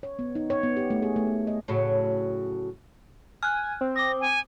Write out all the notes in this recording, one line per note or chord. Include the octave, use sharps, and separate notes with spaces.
C#5
B3
D#4
C#5
B3
G4
A3
G#4
A3
B3
D#5
A2 C#3 F#3
G#5 F6 F#6
C4
D6 D#6 A#6
G#5